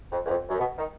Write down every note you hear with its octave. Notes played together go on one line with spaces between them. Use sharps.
F2
E2
F2
F#2
B2
D#3